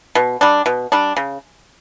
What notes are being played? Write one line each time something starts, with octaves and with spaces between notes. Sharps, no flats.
B2
G3 D4
B2
G3 D4
C#3